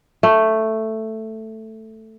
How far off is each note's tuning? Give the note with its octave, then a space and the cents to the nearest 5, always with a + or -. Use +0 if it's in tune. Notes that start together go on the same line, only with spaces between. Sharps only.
A3 +5